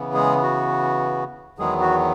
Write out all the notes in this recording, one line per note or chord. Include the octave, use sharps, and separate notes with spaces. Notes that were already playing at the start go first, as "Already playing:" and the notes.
Already playing: C#3 E3 B3
G#3 G#4
F#4
E2 D#3 F#3 G#3 B3 G#4
F#4